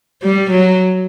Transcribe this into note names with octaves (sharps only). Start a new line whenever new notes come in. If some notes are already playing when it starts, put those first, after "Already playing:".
G3
F#3